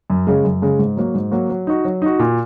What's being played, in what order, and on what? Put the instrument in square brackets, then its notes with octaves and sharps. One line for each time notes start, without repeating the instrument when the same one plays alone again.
[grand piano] F#2
C#3 G#3
F#2
C#3 G#3
G#2
F#3 A#3 F#4
G#2
F#3 A#3 F#4
F#3
D#4 F#4
F#3
D#4 F#4
A#2